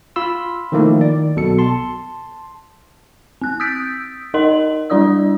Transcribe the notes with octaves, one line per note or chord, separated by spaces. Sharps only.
F4 B5 C6 E6
D#3 F3 A3 A#3 D#4 E4
D#3 D5
B1 B2 A4 C#7
A5 C6
C4 F#6
D#6 E6 G6 A6 B6 D7
D#4 A#4 D#5 F#5 C6 F#7
G3 D4 E4 D5 D#6 E6